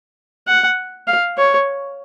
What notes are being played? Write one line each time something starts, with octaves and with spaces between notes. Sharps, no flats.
F#5
F5
C#5